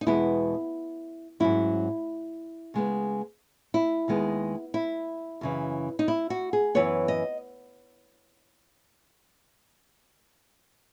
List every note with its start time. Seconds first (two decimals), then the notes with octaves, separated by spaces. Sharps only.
0.01 D#4
0.07 E2 B2 G#3 B3 E4
1.40 G#2 F#3 C#4 E4
2.74 C#3 G#3 B3
3.74 E4
4.08 D#2 D#3 G#3 B3
4.74 E4
5.41 F#2 C#3 E3
5.99 D#4
6.08 E4
6.30 F#4
6.53 G#4
6.75 F#2 E3 B3 C#5
7.08 D#5